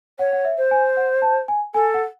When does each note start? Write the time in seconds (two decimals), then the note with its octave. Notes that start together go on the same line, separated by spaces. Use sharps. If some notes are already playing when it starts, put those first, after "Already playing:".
0.19 C#5 F#5
0.33 F#5
0.45 E5
0.58 C5
0.71 G#5
0.97 F#5
1.22 A5
1.48 G#5
1.74 A4 G#5
1.94 F#5